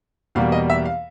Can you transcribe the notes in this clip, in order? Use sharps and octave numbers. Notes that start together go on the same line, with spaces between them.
E2 B2 G3 A#3 F5
D#5
E5
F5